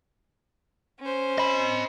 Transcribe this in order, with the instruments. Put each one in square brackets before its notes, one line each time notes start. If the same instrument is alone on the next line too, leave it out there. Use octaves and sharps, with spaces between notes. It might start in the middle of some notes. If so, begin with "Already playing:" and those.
[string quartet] C#4 C5
[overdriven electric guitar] D#5 B5